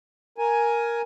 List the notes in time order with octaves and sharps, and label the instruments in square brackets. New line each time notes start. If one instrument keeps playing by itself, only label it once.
[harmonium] A#4 G#5